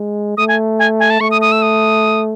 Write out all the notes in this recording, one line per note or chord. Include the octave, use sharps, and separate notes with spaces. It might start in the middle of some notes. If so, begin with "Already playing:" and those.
Already playing: G#3
A3 D#6
G#5
G#5
G#5
A5
A3 C#6
D#6
D#6
E6
D#6